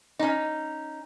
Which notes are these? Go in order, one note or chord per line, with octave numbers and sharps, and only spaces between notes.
C#4 D#4